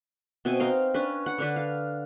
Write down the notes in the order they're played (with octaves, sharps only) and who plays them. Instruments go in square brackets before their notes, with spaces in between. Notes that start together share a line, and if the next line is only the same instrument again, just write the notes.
[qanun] B2 C4 E5 G#5
C4 D#4 F5 G5
C#4 D4 B4
F#5
D3 D4 B4
F5